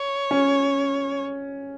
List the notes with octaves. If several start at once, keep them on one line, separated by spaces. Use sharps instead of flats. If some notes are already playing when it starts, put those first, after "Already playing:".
Already playing: C#5
C#4